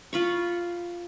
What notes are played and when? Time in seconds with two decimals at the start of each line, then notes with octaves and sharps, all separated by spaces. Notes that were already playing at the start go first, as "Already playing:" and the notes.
0.13 F4 B5 C#6